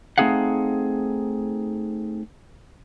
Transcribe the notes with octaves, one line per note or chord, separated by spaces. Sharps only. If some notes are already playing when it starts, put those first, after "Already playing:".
A3 C4 D#4 G#4 F5 F#5